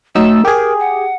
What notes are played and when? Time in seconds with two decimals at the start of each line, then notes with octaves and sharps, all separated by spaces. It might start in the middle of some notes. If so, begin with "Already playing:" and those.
0.15 F#3 A3 D#4 E6
0.45 G4 G#4 A#4
0.80 F#5